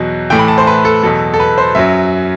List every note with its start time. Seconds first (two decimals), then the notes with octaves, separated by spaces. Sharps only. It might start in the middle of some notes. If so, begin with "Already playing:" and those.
Already playing: E2 B2 F#3
0.30 A2 E3 G5
0.39 B5
0.48 A5
0.58 C5
0.67 B4
0.85 A4
1.03 E2 B2 F#3 A4
1.34 A4
1.40 B4
1.58 C5
1.75 F#2 F#3 E5